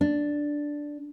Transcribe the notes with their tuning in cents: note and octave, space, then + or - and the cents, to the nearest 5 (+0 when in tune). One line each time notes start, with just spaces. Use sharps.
D4 +0